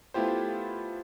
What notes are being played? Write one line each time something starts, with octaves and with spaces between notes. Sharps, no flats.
A3 B3 E4 F4 G4 C5